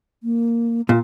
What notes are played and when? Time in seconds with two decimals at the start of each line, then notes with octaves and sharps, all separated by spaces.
0.23 A#3
0.89 A#2 F4